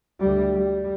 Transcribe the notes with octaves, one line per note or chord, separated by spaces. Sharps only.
D2 G3
G3